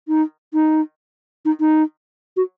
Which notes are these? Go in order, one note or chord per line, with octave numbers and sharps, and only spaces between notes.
D#4
D#4
D#4
D#4
F#4